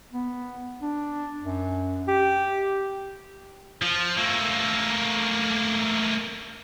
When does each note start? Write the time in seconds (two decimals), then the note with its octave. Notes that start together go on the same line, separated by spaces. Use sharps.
0.13 B3
0.82 D4
1.42 F#2
2.08 G4
3.82 F3
4.17 A3 A#3